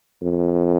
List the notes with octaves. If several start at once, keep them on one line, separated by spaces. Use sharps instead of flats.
F2